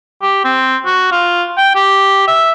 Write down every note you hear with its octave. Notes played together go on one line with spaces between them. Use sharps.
G4
C4
F#4
F4
G5
G4
E5